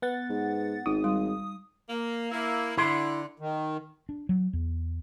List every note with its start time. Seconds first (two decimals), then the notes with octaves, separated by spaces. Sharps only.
0.02 B3 F#5 A6
0.30 G#2
0.86 G#1 D#4 D#6
1.04 G3 C6
1.89 A#3
2.32 A#3 E4
2.77 D3 E4 C6
3.40 D#3
4.09 D4
4.29 F#3
4.53 E2